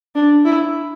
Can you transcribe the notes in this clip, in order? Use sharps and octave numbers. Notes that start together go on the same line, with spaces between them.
D4
E4